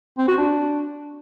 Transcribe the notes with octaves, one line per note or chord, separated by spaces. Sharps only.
C4
F#4
D4